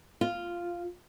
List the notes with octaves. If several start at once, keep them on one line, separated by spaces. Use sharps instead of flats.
F4